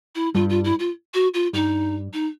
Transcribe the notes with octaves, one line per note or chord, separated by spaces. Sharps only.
E4
G2 G3 F4
F4
E4
F4
F#4
F4
G2 G3 D#4
D#4